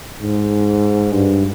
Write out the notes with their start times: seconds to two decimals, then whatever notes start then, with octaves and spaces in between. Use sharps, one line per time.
0.22 G#2
1.13 G2